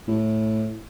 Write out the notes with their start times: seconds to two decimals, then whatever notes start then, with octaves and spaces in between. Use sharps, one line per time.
0.08 A2